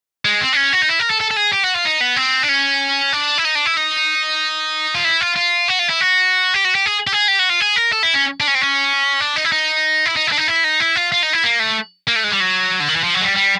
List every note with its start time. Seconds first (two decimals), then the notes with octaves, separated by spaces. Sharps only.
0.25 G#3
0.41 C4
0.53 D4
0.57 C#4
0.73 F#4
0.82 D#4
0.89 E4
1.00 A#4
1.10 A4
1.21 A4
1.31 A4
1.36 G#4
1.52 G4
1.63 F#4
1.74 F4
1.85 D#4
2.01 B3
2.16 C4
2.43 D4
2.49 C#4
3.13 D4
3.38 E4
3.45 D#4
3.55 D4
3.66 E4
3.77 D#4
4.95 F4
5.04 E4
5.21 F4
5.36 F4
5.68 F#4
5.79 F4
5.89 E4
6.01 F#4
6.54 G4
6.64 F#4
6.75 G4
6.86 G#4
7.07 G4
7.12 G#4
7.28 G4
7.39 F#4
7.49 F4
7.60 G#4
7.76 A#4
7.92 A4
8.03 E4
8.14 C#4
8.40 D4
8.48 C#4
8.55 C4
8.62 C#4
9.20 D4
9.36 D#4
9.45 E4
9.52 D#4
10.05 E4
10.16 D#4
10.27 E4
10.32 D4
10.37 D#4
10.48 E4
10.64 D#4
10.80 E4
10.96 F4
11.12 F4
11.23 D#4
11.33 E4
11.44 A#3
11.60 A3
12.07 A#3
12.16 A3
12.24 G#3
12.32 G3
12.40 F#3
12.80 D3
12.89 D#3
12.96 E3
13.04 F3
13.14 F#3
13.21 G#3
13.25 G3
13.36 G3